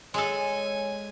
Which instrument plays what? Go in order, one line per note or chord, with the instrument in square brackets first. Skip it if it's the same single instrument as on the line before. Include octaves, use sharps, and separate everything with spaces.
[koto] G#3 A4 [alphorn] C#5 [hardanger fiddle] G#5